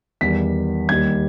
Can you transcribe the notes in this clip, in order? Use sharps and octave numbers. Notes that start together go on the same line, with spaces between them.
E2 D#3 G3 B6
D#2 D#3 G3 G#6